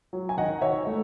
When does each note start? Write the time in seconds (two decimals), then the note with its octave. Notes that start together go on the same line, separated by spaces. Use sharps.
0.13 F#3
0.29 G#5
0.37 D#3 D#5 F#5
0.61 D#3 C#5 E5
0.87 A3